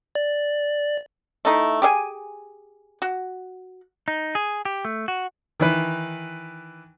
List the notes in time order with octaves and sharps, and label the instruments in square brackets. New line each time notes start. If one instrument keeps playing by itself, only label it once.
[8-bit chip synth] D5
[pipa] A3 D#4 E4
G4 G#4 E5 G#5
F#4
[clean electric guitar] D#4
G#4
G4
A3
F#4
[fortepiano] D#3 E3 B4